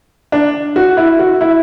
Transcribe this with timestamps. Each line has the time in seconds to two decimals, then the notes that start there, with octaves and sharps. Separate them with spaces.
0.32 D4
0.76 F#4
0.97 E4
1.19 F#4
1.41 E4